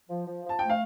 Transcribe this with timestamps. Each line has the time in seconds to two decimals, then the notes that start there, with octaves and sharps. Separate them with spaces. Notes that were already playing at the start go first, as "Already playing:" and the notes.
0.09 F3
0.26 F3
0.44 F3
0.49 A5
0.59 A3 G5
0.70 F5